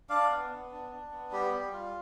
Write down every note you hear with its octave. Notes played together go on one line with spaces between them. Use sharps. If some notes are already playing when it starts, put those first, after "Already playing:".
D4 D5 F5
B3
B3
D4
D4
B3
G3 G4
G3
F4